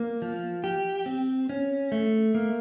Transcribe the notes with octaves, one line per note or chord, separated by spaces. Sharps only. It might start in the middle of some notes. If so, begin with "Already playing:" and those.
Already playing: A#3
F3
G4
C4
C#4
A3
A#3